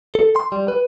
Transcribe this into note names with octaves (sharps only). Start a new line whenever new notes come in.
A4
C6
G3
B4